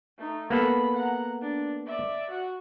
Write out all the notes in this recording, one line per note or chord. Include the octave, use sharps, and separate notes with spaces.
A3 D#4
A#3 B3 A4 B5
F#5 A#5
D4
D5 E5
F#4 F#5